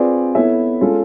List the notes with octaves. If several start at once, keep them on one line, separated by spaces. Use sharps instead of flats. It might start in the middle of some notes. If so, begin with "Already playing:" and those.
Already playing: C4 F4 G#4 B4 D5
B3 E4 A4 C#5 E5
G#3 C#4 F4 A4